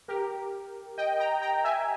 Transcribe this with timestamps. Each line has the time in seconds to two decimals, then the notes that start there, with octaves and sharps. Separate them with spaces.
0.08 G4 A#4
0.98 D#5 G5
1.20 G5 A#5
1.42 G5 A#5
1.64 E5 G#5